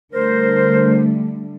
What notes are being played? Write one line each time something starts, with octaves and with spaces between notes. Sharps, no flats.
D3 G3 A3 A#4 C5